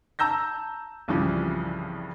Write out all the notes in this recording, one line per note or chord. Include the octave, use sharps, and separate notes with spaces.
A5 A#5 E6 G6 A#6
C2 G2 C#3 E3 F3